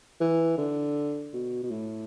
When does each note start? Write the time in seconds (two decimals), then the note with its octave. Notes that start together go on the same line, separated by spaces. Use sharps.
0.20 E3
0.58 D3
1.33 B2
1.63 B2
1.71 A2